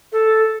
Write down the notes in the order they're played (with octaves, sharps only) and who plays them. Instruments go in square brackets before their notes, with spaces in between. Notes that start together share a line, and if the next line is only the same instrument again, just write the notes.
[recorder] A4